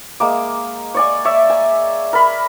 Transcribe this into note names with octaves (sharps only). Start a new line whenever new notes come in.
G#3 A#3 D6
C#5 D5 G#5
C#5 D5 E5
G#5
A#4 B5